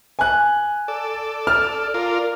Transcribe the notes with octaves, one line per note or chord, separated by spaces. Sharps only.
G#5 F#6
A4 D5
F6
F4 A#4 D5